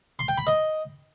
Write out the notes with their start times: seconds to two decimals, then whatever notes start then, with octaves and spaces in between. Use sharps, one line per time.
0.19 C6
0.28 G5
0.38 B5
0.47 D#5